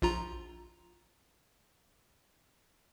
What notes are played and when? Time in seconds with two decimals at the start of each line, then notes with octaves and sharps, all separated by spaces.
0.02 A#1 F4 A#5